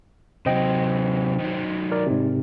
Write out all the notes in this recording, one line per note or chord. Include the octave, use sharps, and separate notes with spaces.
C3 F#3 C5 D#5 G5
D#3 F#3
A#4 D5
G#2 C3